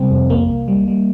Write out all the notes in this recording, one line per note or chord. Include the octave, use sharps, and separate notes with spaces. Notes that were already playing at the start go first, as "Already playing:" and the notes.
Already playing: C3 G3 C4
F2
C2 A#3
C2
G3
G3